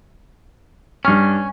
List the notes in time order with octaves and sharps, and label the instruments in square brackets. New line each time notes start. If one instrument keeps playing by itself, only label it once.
[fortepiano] G2 F6 [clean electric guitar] C#4